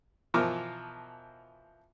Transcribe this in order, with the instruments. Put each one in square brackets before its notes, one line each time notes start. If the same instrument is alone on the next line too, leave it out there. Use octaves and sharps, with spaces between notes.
[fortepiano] B2 E3 F3 F4 A#4 D6